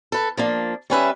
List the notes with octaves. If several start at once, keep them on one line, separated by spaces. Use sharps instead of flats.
A4 B4
F3 A#3 D4
G3 C#4 B4 E5